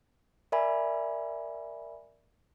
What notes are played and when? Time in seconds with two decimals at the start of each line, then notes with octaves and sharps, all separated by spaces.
0.52 A#4 D5 E5 G#5 B5